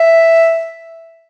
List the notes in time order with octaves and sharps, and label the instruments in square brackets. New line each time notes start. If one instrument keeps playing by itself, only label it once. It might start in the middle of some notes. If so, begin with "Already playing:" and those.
Already playing: [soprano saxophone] E5